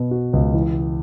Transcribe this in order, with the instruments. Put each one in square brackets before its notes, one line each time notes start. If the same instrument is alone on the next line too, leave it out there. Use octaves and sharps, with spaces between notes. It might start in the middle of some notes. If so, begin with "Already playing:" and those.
Already playing: [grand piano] B2 B3
F#4
C#2
E3